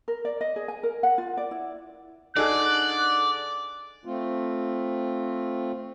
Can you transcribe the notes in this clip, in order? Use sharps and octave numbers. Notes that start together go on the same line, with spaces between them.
A#4
D5
D#5
G#4
G#5
A#4
F#5
F4
D5
E4
D3 D#4 G#4 A4 D5 F#6
A3 C4 F4